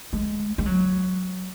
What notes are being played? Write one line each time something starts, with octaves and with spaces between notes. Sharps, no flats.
G#3
G#3
F#3